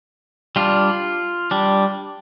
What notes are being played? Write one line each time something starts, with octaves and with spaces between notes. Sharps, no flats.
G3 D4 F4
G3 D4